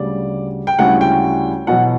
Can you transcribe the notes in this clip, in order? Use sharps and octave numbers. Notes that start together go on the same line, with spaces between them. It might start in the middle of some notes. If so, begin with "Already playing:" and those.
Already playing: D2 C#3 G3 D5
G5
D2 C#3 G3 C#4 E4 F#5
G5
E2 B2 F#3 F#5